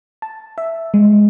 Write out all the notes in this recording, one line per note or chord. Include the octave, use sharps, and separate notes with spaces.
A5
E5
G#3